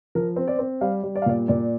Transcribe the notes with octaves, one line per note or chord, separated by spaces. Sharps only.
F3 A#4
C4
D5
C4
G3 F5
G3
D5
F5
A#2 D5
A#2 D5